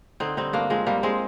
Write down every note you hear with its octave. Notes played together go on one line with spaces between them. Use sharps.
D3 C4 D#4
G3 C4 D#4
G2 A#3 D4
F3 G#3 C4
G2 G3 A#3
G#3 C4